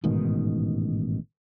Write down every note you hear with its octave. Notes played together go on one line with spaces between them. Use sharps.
A1 G#2 B2 D#3